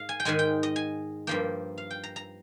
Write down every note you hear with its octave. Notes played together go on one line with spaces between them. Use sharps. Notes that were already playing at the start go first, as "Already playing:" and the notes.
Already playing: G#2 F5
G#5
G5
G#2 D#3 G#3 G#5
G5
D#5
G#5
G2 F3 A#3 G5
F5
G5
A#5
A#5